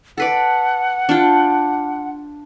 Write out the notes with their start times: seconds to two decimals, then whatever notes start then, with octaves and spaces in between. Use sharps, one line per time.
0.17 A4 B4 D5 F#5
1.09 D4 F4 G5